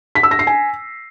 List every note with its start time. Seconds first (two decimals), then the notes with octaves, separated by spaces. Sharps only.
0.15 B6
0.23 E6
0.31 A#6
0.39 C7
0.47 G#5